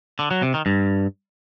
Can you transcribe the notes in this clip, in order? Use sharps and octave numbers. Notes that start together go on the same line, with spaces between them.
D3
F#3
C3
D#3
G2